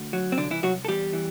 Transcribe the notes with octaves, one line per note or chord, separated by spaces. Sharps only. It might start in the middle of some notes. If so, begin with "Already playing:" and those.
Already playing: D2
F#3
C4
C2 D3 D4
E3 E4
C2 F#3 F#4
A4
E2 G3 G4
E3